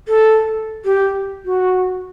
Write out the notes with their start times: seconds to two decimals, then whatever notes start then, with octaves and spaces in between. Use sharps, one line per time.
0.08 A4
0.85 G4
1.46 F#4